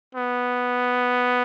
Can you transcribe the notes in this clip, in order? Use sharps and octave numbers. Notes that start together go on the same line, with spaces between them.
B3